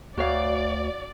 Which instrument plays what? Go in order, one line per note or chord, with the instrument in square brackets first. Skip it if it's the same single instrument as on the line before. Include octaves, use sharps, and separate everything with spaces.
[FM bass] D2 [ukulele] F#4 C#5 F5 [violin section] D5